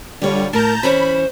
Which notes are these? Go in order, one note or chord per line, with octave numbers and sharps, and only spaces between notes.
D3 G3 F4 C#5
A2 A#4 A5 A#5 G6
E3 C#4 C5 C#5 B5